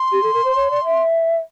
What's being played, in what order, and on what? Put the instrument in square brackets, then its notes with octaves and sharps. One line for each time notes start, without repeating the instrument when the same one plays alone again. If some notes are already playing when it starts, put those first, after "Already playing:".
Already playing: [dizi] C6
[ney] G4
A4
A#4
C5
C#5
D5
E5